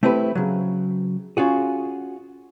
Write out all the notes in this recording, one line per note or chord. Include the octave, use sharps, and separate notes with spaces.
A3 C4 E4 G4 B4
C#3 F#3
C#4 F4 F#4 G#4